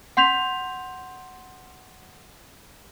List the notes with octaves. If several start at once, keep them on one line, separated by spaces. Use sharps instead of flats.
F#5 C6 G6 B6 F7